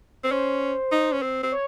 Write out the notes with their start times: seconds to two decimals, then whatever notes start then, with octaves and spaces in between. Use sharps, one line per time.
0.24 C4
0.31 C#4 C5
0.92 D#4
1.12 C#4
1.22 C4
1.43 C4
1.52 C#5